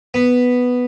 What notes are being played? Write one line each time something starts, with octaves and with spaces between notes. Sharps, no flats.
B3